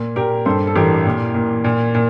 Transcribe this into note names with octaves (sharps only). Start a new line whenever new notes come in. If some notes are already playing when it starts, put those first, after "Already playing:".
Already playing: A#2
A#2 G4 A#4
G2 A4 C5
A4
A1 G4 A#4
A#2
A#2
A#2
A#2